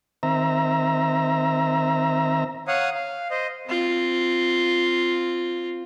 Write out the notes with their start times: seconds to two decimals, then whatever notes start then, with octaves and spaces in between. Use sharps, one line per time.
0.23 D#3 C4 E5 A#5
2.68 C#5 F5 F#5 D#6
2.95 F5
3.31 C5 D#5
3.67 C4 F4